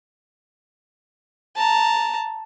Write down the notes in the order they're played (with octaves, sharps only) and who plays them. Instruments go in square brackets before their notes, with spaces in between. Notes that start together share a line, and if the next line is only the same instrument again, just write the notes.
[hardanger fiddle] A5 A#5